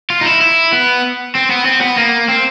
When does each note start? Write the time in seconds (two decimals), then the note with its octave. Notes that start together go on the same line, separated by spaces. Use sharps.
0.10 F4
0.21 D#4
0.26 E4
0.41 E4
0.73 B3
1.35 C4
1.50 B3
1.65 C4
1.81 B3
1.97 A#3
2.29 C4